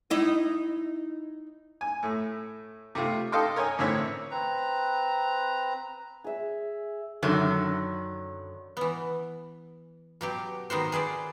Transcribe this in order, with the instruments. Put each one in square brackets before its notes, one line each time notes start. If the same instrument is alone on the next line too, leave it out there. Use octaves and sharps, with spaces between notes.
[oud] D#4 E4 D#5
[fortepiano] G#5
A2 A3
C3 A3 F4
A4 D#5 F5 G5 C6
A#4 C#5 D#5 G#5
A1 D3 C4 E4 C#5 E5
[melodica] C4 B4 A#5
[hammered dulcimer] G#4 E5
[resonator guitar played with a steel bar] F#2 D3 D#3 F#3
[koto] E3 B3
B2 F#3 G4
D#3 B3 F#4 C5
G#4 B4 C5 D5